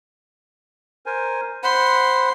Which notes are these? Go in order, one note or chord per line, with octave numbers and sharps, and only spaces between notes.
A#4 C5 G#5
C5 F#5 B5 C6